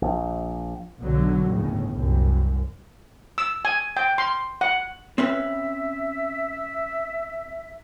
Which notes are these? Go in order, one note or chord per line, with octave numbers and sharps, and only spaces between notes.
A#1
B1 D3 F#3
G1 D#2 A2 C#3
C2 F#2
E6
G#5
G5
C6
F#5
C4 C#4 B4 E5